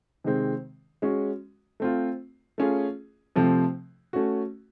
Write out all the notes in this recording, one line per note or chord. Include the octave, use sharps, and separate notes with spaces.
C3 D#3 G#3 C4
G#3 C#4 F#4
A3 C4 F4
A3 C#4 F4 G#4
C3 F3 A3 C4
A3 C#4 F#4